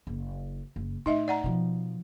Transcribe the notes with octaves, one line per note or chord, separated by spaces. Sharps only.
F#1
F#1
A2 D#4 D#5 E5
D5 F#5 A#5
B2 F3